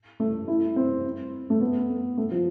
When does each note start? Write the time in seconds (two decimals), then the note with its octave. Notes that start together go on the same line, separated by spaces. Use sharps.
0.20 A3
0.48 E4
0.76 C4
1.50 A3
1.61 B3
2.17 A3
2.31 F3